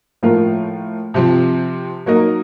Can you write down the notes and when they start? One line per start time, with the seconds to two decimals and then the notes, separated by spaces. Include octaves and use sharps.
0.23 A2 F3 A#3 F4 A#4
1.14 C3 F3 C4
2.06 F#3 A#3 D#4 A#4 D#5